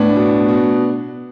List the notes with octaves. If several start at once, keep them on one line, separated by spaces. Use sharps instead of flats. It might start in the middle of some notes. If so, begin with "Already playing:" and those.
Already playing: A2 B3 D4
B2
B2